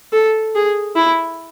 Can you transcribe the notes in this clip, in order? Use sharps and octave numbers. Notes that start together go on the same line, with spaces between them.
A4
G#4
E4